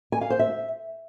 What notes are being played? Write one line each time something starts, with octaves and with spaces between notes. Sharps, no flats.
G#5
F5
C5
E5